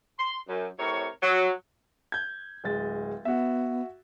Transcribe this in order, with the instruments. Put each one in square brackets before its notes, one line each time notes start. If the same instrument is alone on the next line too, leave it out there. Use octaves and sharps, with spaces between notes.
[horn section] C6
F#2
A2 C3 A#4 C#5
F#3
[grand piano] G6 G#6
D1 G#3 A6
[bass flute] B3 [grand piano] F#4 E5